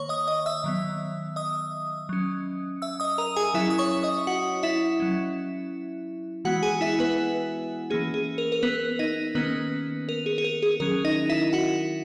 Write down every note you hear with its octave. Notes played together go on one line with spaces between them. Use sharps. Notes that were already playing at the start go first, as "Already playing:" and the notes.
Already playing: D#3 A#3 C#5 C#6
D#5 D#6
D#5 D#6
E5 E6
D#3 F#3 B3
D#5 D#6
F#3 C#4
E5 E6
D#5 D#6
A#4 A#5
G#4 G#5
F#3 C#4 E4 E5
D#6
C#5 C#6
D#5 D#6
F#4 F#5
E4 E5
F#3 C#4
E3 G#3 B3 F#4 F#5
G#4 G#5
E4 E5
B3 B4
E3 A#3 C#4 G#4
G#4
A#4
A#4
B3 B4
D#4 D#5
D#3 A#3 B3 C#4 B4
A#4
G#4
G#4
A#4
G#4
D#3 F#3 C#4 A#4
D#4 D#5
E4 E5
F#4 F#5